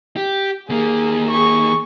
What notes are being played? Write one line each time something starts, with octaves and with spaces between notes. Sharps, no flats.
G4
D#2 A#3 G#4
G#4 C#6